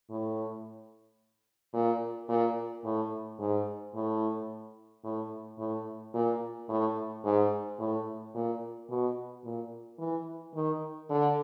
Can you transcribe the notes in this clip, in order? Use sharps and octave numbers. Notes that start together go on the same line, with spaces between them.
A2
A#2
A#2
A2
G#2
A2
A2
A2
A#2
A2
G#2
A2
A#2
B2
A#2
E3
D#3
D3